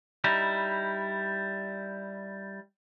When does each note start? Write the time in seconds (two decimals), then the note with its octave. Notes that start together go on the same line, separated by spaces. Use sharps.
0.24 G3 D#4 E4